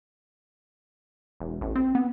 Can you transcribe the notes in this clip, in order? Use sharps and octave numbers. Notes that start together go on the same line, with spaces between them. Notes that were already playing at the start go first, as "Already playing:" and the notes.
E1
A1
C4
B3